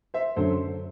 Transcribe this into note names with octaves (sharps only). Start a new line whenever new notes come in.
C5 E5
F#2 D3 F#3 A4 C5